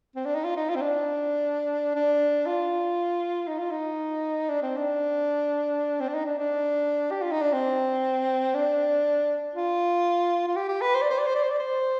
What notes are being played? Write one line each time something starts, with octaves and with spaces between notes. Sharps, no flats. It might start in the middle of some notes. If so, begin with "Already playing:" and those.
C4
D4
D#4
F4
D#4
F4
C4
D4
D4
F4
D#4
F4
D#4
D4
C4
D4
C4
D4
D#4
D4
D4
G4
F4
D#4
D4
C4
D4
F4
F4
G4
G4
B4
C5
D5
C5
D5
C5
D5
C5
D5
C5